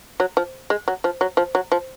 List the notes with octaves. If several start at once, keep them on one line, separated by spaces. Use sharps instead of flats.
F#3
F3
G#3
F#3
F3
F#3
F3
F#3
F3